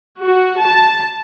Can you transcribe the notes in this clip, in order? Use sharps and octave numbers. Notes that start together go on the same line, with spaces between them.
F#4
A5